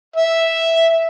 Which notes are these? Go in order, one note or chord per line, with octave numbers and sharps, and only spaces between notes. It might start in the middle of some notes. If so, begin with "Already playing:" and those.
E5